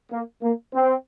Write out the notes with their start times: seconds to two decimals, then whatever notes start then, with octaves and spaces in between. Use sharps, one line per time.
0.10 A#3
0.41 A#3
0.74 C4